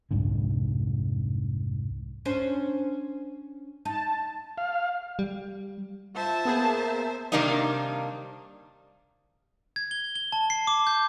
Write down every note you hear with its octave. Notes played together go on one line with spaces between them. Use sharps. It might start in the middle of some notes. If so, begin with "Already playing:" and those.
C2 F2 G#2 D3
C#4 D4 C5
D#4 A5
F5
G3
F4 C5 E5 A5
A#3 B3 G#4
C3 D#3 G3 A#3 D4 D#4
G#6
G7
G7
A5
C7
D6
G6